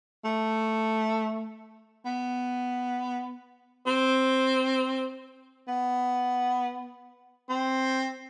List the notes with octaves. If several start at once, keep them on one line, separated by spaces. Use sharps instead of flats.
A3
B3
C4
B3
C4